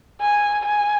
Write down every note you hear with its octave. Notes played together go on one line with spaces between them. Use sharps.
G#5
G#5